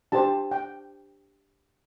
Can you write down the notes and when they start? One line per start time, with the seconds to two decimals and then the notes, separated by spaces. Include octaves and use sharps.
0.12 D4 G4 C5 A5
0.51 G5